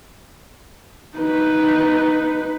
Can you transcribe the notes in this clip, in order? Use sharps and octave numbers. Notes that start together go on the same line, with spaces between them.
D#4 B4